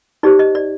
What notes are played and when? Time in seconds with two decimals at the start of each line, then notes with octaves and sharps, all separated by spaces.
0.23 D#4 G4 C5 D5
0.39 D#5
0.55 D5